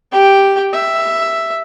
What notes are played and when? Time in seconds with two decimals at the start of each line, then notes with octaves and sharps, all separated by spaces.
0.12 G4 G5
0.73 E5